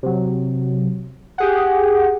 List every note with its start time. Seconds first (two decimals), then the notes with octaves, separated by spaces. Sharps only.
0.03 C3 F#3
1.38 G4 G#4 F#5